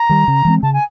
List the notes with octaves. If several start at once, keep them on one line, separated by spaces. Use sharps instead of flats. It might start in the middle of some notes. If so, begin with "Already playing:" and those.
Already playing: A#5
D#3 G3
C#3
E3 G#3 C4
C#3 A5
G#5